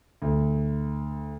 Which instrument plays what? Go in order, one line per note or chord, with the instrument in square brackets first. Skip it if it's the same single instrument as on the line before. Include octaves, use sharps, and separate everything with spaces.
[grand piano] D2